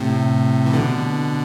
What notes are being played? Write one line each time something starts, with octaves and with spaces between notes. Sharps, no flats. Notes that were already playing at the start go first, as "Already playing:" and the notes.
Already playing: A2 C3
E3
B2 D3